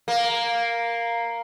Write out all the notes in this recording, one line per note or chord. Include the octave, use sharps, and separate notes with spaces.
A#3